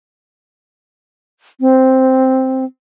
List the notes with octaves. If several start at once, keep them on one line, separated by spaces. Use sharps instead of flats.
C4